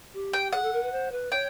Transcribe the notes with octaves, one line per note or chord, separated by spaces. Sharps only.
G4
G5
G#4 F#5
A4
A#4
B4
C5
B4
C#5 G5